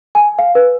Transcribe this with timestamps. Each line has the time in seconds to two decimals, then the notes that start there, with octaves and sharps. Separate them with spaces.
0.15 G#5
0.39 F5
0.55 B4